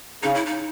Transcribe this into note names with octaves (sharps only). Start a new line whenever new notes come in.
C#3 D#4
E4
D#4